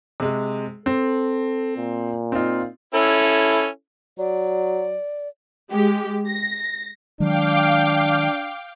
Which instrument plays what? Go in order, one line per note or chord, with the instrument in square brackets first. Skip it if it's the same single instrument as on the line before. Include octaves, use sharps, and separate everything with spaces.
[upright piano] C3 G#3
[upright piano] C4 [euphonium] A4
[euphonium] A#2
[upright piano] C4 D#4 F4
[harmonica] C#4 E4 A4
[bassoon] F#3 [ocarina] D5
[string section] G#3 G4
A#6
[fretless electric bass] D#3 F#3 G#3 [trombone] D4 [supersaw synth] F5 G5 D6